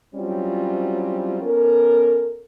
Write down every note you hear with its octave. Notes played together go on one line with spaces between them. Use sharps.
F#3 G3 C4 C#4 E4 F4
B3 C#4 A4 A#4